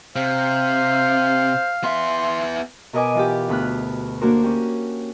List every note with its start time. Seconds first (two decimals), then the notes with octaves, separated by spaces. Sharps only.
0.16 C3 C5 F5
1.84 B3 E5 C6
2.93 B2 A#4 B4 D#5 G#5 D6
3.14 E3 F4 G4
3.49 D2 B3 B5 F6 F#6
4.21 A#3 D4 F#4 A#4 C5
4.43 C#4 G4